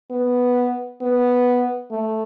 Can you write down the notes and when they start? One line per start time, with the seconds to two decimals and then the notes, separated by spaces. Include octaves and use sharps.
0.11 B3
1.01 B3
1.91 A3